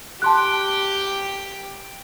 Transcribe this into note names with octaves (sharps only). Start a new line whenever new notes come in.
G4 G5 A5 C6 F#6